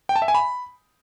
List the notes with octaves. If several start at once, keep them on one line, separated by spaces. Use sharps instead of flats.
G5
A5
E5
G#5
B5